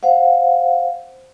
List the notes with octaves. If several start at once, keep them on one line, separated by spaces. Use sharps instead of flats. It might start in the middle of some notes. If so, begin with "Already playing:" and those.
C5 F5 F#5